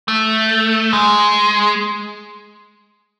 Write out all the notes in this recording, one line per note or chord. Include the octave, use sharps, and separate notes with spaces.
A3
G#3